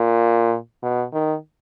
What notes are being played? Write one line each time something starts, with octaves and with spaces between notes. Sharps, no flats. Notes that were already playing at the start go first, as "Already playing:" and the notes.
Already playing: A#2
B2
D#3